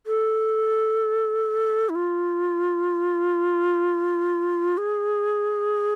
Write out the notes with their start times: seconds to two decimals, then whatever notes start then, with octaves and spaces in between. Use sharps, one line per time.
0.07 A4
1.89 E4
1.95 F4
4.78 G#4